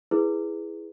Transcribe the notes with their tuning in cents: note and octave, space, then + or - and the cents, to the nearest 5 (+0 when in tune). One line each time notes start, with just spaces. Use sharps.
E4 +0 G#4 +0 B4 +0